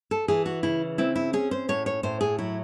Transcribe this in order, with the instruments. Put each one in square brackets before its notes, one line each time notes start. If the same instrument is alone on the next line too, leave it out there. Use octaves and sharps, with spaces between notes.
[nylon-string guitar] A4
E3 G#4
F#4
C#3 E4
C4 E4
E4
C#4 G#4
C5
A2 C#5
C#5
A2 C5
G#4
F#3 E4